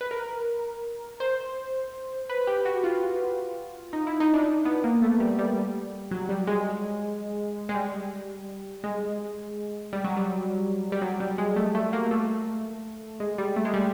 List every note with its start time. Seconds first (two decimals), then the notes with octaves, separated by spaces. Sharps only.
0.01 B4
0.11 A#4
1.20 C5
2.30 B4
2.47 G4
2.65 F#4
2.84 F4
3.93 D#4
4.07 E4
4.20 D#4
4.34 D4
4.65 B3
4.84 A#3
5.02 A3
5.20 G3
5.39 G3
6.11 F#3
6.29 G3
6.47 G#3
7.69 G#3
7.74 G3
8.84 G#3
9.93 G3
10.04 F#3
10.17 G3
10.92 G3
11.01 F#3
11.20 G3
11.38 G#3
11.56 A3
11.75 A3
11.93 A#3
12.11 A3
13.20 G#3
13.38 G3
13.56 A3
13.65 G#3
13.74 G3